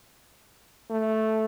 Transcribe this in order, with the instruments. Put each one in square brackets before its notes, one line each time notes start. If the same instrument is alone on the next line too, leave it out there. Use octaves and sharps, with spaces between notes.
[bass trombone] A3